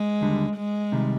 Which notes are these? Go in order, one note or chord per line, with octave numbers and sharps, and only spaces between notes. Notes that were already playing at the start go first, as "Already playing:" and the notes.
Already playing: G#3
D#2 D3 G3
G#3
C3 D#3 G3